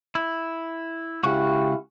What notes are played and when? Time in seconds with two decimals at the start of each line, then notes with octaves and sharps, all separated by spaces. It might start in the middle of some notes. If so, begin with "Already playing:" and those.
0.15 E4
1.24 C#2 C#4 E4 F#4 G4 F5